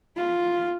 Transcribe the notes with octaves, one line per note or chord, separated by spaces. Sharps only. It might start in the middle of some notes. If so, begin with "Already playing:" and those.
F4